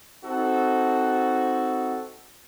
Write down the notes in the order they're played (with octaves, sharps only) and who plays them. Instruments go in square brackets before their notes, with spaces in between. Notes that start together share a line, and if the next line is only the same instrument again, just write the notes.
[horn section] C4 D#4 F#4 A4